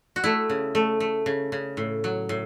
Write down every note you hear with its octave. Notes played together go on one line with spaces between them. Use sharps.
F#4
A3 E4
C#3
A3
A3
C#3
C#3
A2
F#3
A2